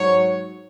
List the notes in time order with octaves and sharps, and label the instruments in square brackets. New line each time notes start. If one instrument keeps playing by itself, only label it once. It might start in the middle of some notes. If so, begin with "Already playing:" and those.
Already playing: [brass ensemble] G#2 F#3 C#5